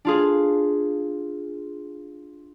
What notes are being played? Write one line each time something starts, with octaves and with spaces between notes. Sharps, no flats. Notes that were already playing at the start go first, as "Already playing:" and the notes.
D4 F4 G#4